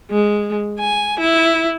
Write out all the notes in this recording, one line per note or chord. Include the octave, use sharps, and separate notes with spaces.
G#3
G#5
E4